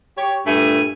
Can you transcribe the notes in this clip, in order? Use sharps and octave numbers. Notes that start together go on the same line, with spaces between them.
G4 C#5
G2 A#2 A3 E5 G#5